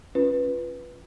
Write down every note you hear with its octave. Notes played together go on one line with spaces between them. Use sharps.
C#4 F4 B4